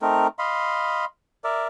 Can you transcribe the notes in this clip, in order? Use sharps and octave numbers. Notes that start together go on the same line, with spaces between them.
A3 C4 D#4 A#4
D#5 F5 B5 C6
A#4 D5 E5